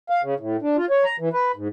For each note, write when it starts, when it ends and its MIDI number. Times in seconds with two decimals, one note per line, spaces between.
0.10 0.21 77
0.23 0.34 49
0.40 0.57 45
0.62 0.77 62
0.77 0.86 65
0.90 1.04 73
1.04 1.16 82
1.19 1.29 52
1.33 1.52 71
1.56 1.68 44